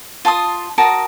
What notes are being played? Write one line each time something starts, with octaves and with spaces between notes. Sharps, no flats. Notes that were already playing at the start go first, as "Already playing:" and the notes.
F4 A5 C6 D#6
F#4 A#4 A5 D#6